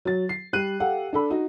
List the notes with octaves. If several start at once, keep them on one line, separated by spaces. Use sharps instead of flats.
F#3 A6
C7
G3 F#6 D#7
G4 A4 F5 F#5
D4 A4 B5
D#4 F#4